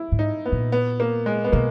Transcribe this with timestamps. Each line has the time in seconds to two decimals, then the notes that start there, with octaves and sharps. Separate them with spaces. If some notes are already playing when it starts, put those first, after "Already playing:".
Already playing: E4
0.12 G#2
0.19 D#4
0.46 B3
0.52 A#2
0.72 B3
1.00 A#3
1.26 G#3
1.44 B3
1.52 B2 A#3